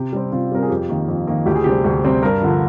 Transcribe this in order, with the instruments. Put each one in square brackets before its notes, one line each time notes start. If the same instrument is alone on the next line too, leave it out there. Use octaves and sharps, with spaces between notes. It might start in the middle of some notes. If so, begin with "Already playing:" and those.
Already playing: [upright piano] C3 G4
G3 C4
C3 F4
G3 C4 A#4
G#4
F2 G4
D#3 A#3
F2
D#3 A#3
D2 G4
G#4
C3 G3 C4 G4
D2
C3 G3 C4
G2 A#4
D3 F3